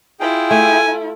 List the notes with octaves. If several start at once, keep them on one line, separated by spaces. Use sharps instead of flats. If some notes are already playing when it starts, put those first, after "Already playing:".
E4 F4 G#4 G5
A3 G#5